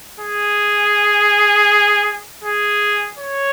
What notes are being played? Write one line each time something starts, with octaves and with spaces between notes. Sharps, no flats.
G#4
G#4
C#5